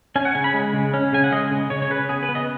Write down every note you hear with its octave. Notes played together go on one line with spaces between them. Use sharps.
C#4 G#5
F#5
C#3 G#5
B5
G#3
C#3
C#4
C#3 G#5
F#5
G#3 D#5
C#3
C#3 C#5
C#5
C#3 B4
B3 G#4
B4
B3
D#5